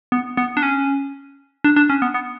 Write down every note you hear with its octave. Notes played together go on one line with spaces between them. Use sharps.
B3
B3
D4
C#4
D4
D4
C#4
B3
B3